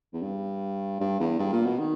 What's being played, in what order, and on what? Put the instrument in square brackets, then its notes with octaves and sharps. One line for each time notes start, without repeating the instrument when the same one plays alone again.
[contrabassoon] E2
G2
G2
E2
G2
A#2
B2
D#3